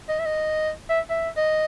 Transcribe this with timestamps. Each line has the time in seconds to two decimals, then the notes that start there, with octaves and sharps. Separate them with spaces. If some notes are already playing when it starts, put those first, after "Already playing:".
0.09 D#5
0.19 E5
0.26 D#5
0.89 E5
1.10 E5
1.37 D#5